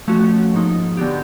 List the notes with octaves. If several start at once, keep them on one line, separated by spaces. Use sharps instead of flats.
F3 A3 C#4 F#4
G#2 F3 A#3 D#4
D3 F#3 B3 D4 G4